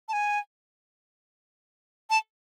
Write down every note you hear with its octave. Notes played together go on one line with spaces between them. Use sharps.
A5
G#5
A5